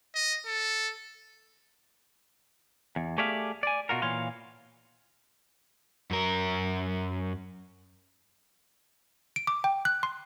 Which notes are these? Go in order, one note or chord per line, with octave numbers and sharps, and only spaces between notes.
D#5
A4
E2
A3 G4 G#4 D5 E5 F5
D5 G#5
B2 F4 F#4 A#4
A#2 E3 C#5 F5 C6
F#2 A#4
D7
D6
G5
F#6
C6